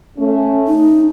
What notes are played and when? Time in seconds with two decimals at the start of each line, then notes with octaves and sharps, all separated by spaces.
0.19 A3 C#4
0.68 D#4